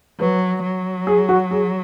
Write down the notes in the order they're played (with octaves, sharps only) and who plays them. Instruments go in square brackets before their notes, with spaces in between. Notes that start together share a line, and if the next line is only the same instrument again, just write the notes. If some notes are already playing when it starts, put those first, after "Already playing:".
[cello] F#3 [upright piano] B4
[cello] F#3
[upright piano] G#4
F#4
G#4